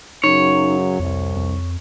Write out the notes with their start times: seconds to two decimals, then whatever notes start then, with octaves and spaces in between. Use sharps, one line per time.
0.24 F#2 C#3 F#3 D#4 C#5
1.00 C2 F2
1.36 F2